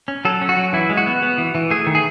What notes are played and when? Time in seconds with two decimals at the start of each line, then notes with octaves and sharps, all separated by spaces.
0.08 C#4
0.25 F#3 A4
0.41 C#4
0.49 F#4
0.57 F#3
0.73 E3 E4
0.90 G#3
0.97 F#4
1.06 B3
1.23 B3
1.38 E3
1.55 E3
1.70 A3 G#4
1.87 D#3
1.95 G#4